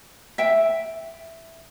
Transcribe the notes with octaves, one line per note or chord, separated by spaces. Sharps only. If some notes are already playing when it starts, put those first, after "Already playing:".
E5 G5